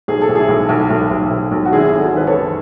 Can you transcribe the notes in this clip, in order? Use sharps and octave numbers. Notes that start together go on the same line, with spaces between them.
B1 G#4
A4
B1
E4 G#4
B1
B1
B1
B1
B1
B1
F#4
G#1 E4 G#4
G#1
F#4 A4
G#1 B4
A4 C#5
F#2